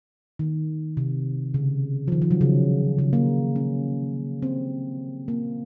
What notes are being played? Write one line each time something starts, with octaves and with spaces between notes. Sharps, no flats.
D#3
C3
C#3
F3
D#3
F3
F#3
C#3
C#3
A#3
C#4
C4
A#3